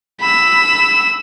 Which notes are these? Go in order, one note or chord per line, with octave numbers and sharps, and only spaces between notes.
B5 E6